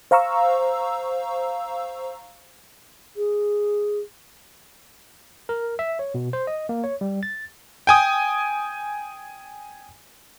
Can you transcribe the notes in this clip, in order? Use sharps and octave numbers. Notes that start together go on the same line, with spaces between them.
C5 F5 A#5 C#6 E6
G#4
A#4
E5
C#5
B2
C5
D#5
A#3
C#5
G3
A6
G5 G#5 D#6